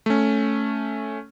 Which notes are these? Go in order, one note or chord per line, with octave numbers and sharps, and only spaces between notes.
A3 C#4